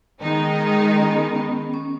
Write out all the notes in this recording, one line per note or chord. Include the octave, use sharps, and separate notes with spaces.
D#3 G#3 B3 D#4
C#4
B3
B3
C#4